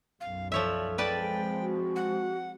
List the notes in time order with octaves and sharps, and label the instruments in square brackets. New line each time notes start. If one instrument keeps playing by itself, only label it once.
[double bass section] B1 F#2 [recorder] F5
[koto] F3 C#5 E5 [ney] A4 [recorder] D5
[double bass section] F3 G#3 C4 [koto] B4 D5 A5 [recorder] G5
[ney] F#4
[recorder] F#5